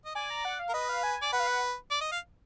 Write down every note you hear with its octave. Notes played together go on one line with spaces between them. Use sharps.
D#5
D5 G#5
A#5
F#5
F5
A#4
B4 D#5
F5
G#5
D5
B4 F#5
F5
F#5
D5
D#5
F5